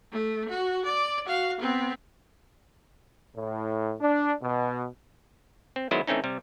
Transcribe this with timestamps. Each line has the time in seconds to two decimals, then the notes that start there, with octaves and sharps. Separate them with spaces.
0.12 A3
0.49 F#4
0.86 D5
1.26 F#4 F5
1.61 B3 C4
3.36 A2
4.01 D4
4.41 B2
5.76 C4
5.91 D#3 F#3 G#3 B3 E4 C5
6.07 E3 A3 C4 C#4 D#4
6.24 C3 G3